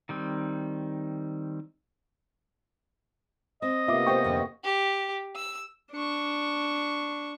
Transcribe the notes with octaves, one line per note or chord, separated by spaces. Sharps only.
D#3 G3 C4
C4 D#5
C3 A#3 B3 F4 E5 D6
F4 G4 C5 G5 C#6
F2 D3
G4
E6
D4 C#6